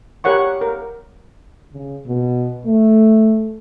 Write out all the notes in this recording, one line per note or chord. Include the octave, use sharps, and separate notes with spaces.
G4 A#4 C#5 F#5 C#6
A#4
C#3
B2
A3